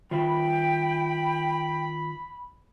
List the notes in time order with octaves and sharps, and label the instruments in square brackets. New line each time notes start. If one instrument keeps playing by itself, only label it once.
[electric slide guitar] D#3 F4 [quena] G5 [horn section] B5